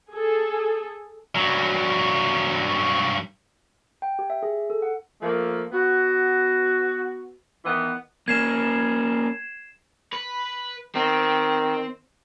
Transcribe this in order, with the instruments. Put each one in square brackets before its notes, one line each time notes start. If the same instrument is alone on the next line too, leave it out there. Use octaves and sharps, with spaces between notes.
[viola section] G#4 A4
[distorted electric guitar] G2 F#3
[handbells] G5
G4
E5
G#4
A4
F#5
[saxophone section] F3 A3 A#3
B3 F#4
D#3 E3 B3
[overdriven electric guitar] A#3 C#4 [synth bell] G#6 C7 E7
[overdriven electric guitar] B4
[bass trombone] D#3 [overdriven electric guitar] C4